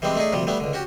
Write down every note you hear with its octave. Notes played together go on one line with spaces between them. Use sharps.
E3 G3 G#3 C4 D4
A3 D4 D#4 G#4
D2 C3 F3 G3
G3 A3 B3 D4
C#2 D3
C#4 F#4 G4